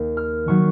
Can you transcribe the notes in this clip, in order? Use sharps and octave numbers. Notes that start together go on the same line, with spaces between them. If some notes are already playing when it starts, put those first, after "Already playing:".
Already playing: D#2 D#3 A#3
F6
D#3 F#3 C#6